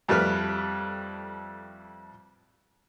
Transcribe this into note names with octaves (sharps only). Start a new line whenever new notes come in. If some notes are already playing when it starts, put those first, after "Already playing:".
F2 G3 A3 B4 F6